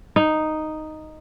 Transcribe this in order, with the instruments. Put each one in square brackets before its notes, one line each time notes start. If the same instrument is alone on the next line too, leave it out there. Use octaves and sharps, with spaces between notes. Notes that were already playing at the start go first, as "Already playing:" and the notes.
[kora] D#4